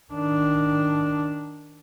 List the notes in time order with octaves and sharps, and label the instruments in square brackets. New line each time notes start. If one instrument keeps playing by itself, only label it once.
[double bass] D#3 D4